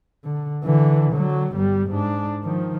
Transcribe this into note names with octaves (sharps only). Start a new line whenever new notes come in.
D3
D3 E3
D3 F#3
G1 G3
G#2 D4
D#3 F3